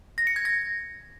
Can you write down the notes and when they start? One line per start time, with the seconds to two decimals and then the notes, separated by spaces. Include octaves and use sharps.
0.18 A#6
0.27 C#7
0.36 G#6
0.45 A#6